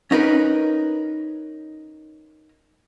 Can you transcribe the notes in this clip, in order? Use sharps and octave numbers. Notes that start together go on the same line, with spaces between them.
C#4 D#4 A#4 B4